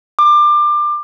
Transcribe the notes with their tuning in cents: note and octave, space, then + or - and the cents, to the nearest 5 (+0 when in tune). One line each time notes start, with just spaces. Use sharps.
D6 +25